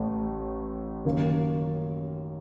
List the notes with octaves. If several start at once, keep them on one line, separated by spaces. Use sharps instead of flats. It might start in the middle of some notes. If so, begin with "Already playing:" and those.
Already playing: A1 A2 A3
F#2 D#3 A#3